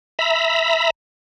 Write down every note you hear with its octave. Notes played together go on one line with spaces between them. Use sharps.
E5 A#5 B5